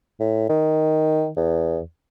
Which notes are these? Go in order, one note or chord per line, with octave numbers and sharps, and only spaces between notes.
A2
D#3
E2